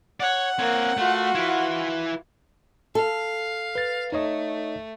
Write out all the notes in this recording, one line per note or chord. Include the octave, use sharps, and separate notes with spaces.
C#5 D5 F#5
A#3 C4 C#5
A3 F4 F#4
E4 B4
A4 F5
B4 A6
A3 D#4 C#5 D#5